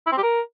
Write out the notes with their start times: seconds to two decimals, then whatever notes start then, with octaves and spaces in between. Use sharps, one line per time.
0.07 E4
0.12 C4
0.17 G4
0.23 A#4